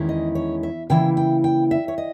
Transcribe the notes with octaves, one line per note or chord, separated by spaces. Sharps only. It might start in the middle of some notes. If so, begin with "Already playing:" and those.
Already playing: E2 D#3 G#3 C#4 E4
D#5
C#5
E5
C#3 E3 A#3 E4 G5
G5
G5
E5
C#5
D#5